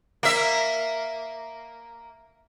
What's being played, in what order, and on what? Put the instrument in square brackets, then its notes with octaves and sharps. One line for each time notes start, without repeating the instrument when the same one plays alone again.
[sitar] A#3 E5